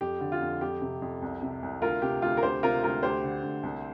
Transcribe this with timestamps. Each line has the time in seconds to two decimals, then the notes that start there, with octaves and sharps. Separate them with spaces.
0.01 F2 G4
0.21 D3
0.32 F4
0.42 F2
0.61 F2 G4
0.81 C3
1.02 F2
1.22 C2
1.42 C3
1.63 C2
1.82 D2 F4 A#4
2.02 C3 G4
2.22 D2 F4
2.37 A#4
2.42 D2 G4 C5
2.63 C3 F4 A#4
2.83 D2 F4 A#4
3.03 D2 G4 C5
3.24 D3
3.43 D2
3.63 C2